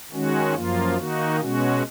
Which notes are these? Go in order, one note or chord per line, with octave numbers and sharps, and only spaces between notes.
D#3 G#3 C#4 F#4
F#2 F3 A#3 F4
D#3 A#3 D#4 F#4
B2 G#3 C#4 F#4